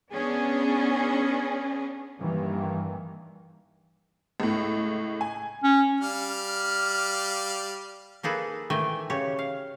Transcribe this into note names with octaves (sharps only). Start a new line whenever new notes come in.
B3 C#4 D4 G#4
G2 D#3 E3 A#3
C#2 A2
G#5
C#4
G3 F5 F6
A#3 D#4 G#4 A4 B4
D#3 E3 A3 G5 G#5
C#3 G4 C#5
F5